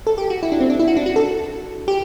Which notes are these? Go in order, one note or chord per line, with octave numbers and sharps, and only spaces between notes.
A4
G4
F#4
E4
D4
C4
D4
E4
F#4
D4
F#4
A4
G4